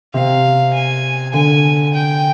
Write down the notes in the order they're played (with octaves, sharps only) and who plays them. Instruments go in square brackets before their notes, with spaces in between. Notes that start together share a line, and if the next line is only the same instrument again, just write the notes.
[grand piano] C3 [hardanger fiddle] F5
[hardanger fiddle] G#5
[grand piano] D3 [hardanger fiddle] G#5
[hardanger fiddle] G5